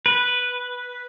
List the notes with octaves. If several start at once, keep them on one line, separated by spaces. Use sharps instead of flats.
B4